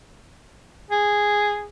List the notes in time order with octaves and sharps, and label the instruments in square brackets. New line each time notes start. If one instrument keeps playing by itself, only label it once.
[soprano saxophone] G#4